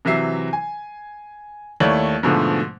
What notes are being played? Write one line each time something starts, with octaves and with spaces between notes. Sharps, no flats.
C3 E3 F#3 E5 C7
G#5
D#2 A3 E4 C#5 D5 F#7
G#2 B2 D3 F3 G#3 A3